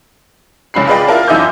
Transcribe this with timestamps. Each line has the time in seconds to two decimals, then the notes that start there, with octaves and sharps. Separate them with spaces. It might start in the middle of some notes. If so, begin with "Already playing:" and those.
0.74 F#1 C2 C#4 B5 C7
0.87 F4 G#4 B4 D5 D#5 G5
1.07 E4 F4 A#4 A5
1.28 F#2 E3 D#4 E5 D6 G6